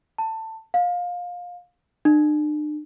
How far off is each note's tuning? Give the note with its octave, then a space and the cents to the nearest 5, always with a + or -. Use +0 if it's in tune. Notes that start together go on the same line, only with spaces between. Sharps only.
A5 +20
F5 +20
D4 +45